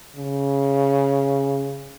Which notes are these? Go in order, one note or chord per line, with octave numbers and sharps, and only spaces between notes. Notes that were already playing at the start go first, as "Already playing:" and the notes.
C#3